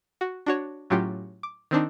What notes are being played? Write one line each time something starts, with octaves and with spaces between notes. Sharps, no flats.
F#4
D4 F#4 C#5
A2 F#3 C#4 F4 G4
D6
D#3 C4 D4 D#4